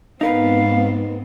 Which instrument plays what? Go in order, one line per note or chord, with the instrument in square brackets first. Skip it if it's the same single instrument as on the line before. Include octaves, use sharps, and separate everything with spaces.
[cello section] G#2 B3 C4 [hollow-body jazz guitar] D#4 A#4 B4 [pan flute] F5